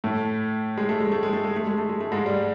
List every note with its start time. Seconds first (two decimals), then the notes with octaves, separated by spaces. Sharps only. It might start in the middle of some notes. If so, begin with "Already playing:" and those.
0.04 A2 A3
0.78 G#3
0.89 A3
1.00 G#3
1.12 A3
1.23 G#3
1.33 A3
1.45 G#3
1.56 A3
1.67 G#3
1.78 A3
1.89 G#3
2.01 A3
2.12 G#2 G#3
2.26 G3